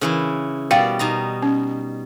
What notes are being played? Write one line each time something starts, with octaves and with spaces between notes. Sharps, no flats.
C#3 E3 E4
B2 G3 D5 F5 G5
B2 D#4 A#5
C#4